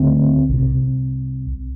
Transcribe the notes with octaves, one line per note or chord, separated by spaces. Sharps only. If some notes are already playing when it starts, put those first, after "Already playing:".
Already playing: D2 D3 C4
C2 C3